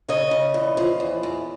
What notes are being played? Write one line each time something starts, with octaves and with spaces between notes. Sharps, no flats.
C#3 C#5 D#5
C#3
E2
F3
E2
E2